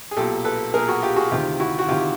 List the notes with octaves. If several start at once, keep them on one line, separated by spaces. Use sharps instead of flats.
G#4
B1 A#2 G4 A4
A4 B4
B1 A#2 G#4 A#4
F#4 G#4
F4 G4
F#4 G#4
D2 C3 D#3 F4 G4
E4 F#4
F#4
D2 C3 D#3 F4 G4